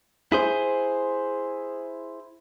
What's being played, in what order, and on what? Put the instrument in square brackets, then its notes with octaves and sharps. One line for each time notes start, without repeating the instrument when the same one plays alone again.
[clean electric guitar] E4 G#4 C5